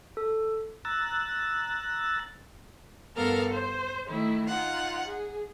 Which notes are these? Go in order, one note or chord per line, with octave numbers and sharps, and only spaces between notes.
A4
A#5 E6 F#6 A6
G2 B3 A4 A#4 F5 F6
C5
D#3 A3 E4
D#4 F4 F#5
G#4